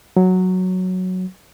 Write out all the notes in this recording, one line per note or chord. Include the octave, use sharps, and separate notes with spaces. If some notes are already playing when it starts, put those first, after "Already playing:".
F#3